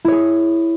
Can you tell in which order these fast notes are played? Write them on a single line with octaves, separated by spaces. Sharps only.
E4 C#5 G#4